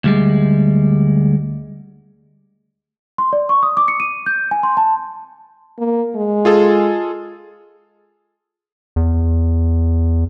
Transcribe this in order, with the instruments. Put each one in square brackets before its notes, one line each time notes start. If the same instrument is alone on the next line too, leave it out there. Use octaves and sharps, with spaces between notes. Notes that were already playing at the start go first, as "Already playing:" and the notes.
[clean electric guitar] D2 G3 G#3
[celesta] C6
D5
C#6
D#6
D6
C#7
D#7
G6
G#5
C6
A5
[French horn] A#3
G#3
[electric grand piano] F4 G#4 A4
[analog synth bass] E2